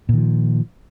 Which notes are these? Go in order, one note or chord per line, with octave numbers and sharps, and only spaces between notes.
A#2 D#3 F3